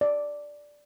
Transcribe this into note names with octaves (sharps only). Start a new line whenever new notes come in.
D5